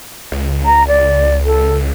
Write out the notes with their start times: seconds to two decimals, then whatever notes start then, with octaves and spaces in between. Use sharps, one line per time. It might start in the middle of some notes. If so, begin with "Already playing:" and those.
0.32 C#2
0.65 A#5
0.87 D5
1.45 A4